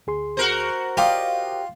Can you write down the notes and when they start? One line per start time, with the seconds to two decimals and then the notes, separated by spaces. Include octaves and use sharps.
0.07 D2 G#4 C6
0.37 F#4 A#4 C5
0.97 F4 G4 D5 D#5 F5